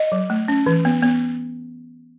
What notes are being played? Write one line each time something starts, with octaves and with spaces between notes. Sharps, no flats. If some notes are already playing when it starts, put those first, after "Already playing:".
Already playing: D#5
F#3
A3
C#4
E3
B3
B3